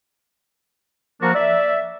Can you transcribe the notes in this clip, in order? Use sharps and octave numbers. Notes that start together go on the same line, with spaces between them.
F3 A#3 D4 F#4 A#4
D5 E5